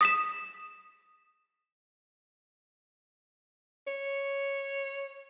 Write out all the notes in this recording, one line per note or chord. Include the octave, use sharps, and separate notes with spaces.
D#6 B6 E7
C#5